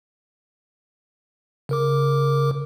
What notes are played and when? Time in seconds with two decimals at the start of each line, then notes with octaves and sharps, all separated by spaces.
1.69 C#3 A#4 D6